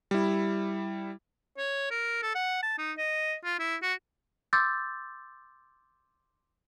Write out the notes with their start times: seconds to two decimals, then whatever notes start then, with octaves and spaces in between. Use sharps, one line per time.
0.11 G3 E4
1.58 C#5
1.91 A#4
2.22 A4
2.35 F#5
2.63 A5
2.78 D#4
2.98 D#5
3.44 F4
3.59 E4
3.82 F#4
4.53 C6 D6 E6 G6 A6